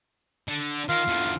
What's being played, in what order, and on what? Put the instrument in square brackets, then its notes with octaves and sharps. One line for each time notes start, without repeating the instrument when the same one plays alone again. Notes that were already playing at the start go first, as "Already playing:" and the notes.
[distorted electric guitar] D3
[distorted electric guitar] D#3 [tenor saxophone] F4
[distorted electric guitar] E2 D3